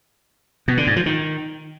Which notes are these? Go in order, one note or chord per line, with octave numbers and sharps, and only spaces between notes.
B2
D3
G#2
F3
D#3